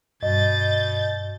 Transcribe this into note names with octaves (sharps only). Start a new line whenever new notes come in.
G2 B2 D#5 G6 A6